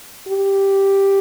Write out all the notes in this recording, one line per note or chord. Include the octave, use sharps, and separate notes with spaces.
G4